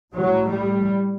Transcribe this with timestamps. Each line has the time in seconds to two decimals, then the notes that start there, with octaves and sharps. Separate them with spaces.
0.13 A2 F#3
0.51 G3